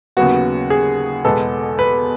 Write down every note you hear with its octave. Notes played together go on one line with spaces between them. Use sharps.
D#2 C#3 F#3 B3 F#4
G#4
E2 B2 G#3 B3 A4
B4